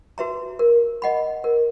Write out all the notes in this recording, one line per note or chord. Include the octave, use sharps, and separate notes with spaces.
F#4 B4 E5 A#5
A#4
D#5 F#5 B5
A#4